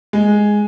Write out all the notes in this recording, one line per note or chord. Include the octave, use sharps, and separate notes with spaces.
G#3